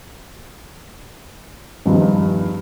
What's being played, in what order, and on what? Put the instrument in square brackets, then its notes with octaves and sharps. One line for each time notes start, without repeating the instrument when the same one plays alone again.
[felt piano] E2 G2 D#3 F3